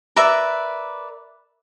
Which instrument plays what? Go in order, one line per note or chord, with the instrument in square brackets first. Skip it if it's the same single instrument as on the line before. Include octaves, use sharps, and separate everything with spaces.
[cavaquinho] A#4 B4 D5 E5